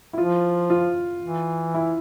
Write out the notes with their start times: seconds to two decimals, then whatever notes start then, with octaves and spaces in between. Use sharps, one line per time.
0.13 E4
0.17 F3 F4
0.70 F4
1.23 E3
1.74 E4